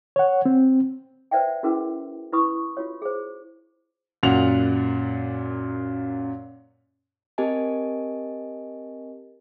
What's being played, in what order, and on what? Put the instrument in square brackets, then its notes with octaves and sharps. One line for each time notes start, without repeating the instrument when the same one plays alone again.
[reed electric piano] C#5 F#5
C4
[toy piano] B4 C5 D5 E5 F#5 G5
C#4 E4 F#4 G#4 A#4 B4
E4 B4 B5 C#6 D#6
F4 F#4 C#5
G#4 C5
[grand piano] F#2 A#2 F#5 F7
[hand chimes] C4 G4 A#4 D#5 G#5 A5